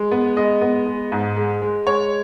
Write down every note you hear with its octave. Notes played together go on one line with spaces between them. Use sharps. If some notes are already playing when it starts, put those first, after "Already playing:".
Already playing: G#3
B3
G#3 D#5
B3
G#3
G#2
G#3
G#3
G#3 C#5